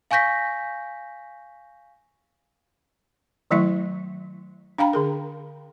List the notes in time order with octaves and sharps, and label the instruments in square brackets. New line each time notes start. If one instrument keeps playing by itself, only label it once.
[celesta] F5 G#5 C#6 G6 A#6 B6
[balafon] D#3 F#3 A3 E4 E5 C#6
D4 F5 G5 A#5 B5
D3 G#4 A#4